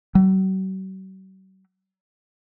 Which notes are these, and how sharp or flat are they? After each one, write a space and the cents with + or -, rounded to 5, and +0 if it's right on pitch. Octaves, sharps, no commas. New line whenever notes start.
F#3 +45